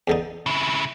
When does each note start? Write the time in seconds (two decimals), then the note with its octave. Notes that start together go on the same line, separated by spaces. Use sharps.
0.08 E2 D3 D#4
0.46 C#3 E4